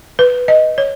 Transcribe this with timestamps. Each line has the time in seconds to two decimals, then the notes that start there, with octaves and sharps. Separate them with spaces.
0.19 B4
0.48 D#5
0.78 C#5